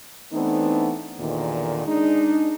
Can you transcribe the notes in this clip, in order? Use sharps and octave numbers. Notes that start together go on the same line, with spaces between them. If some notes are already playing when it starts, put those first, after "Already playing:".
E3 A3 B3 C4 D4 D#4
E2 A#2 D3 D#3
G#3 D4 D#4